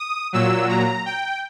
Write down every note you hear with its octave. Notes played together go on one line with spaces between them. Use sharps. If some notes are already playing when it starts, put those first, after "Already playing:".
Already playing: D#6
A#2 F#3 E6
A#5
G5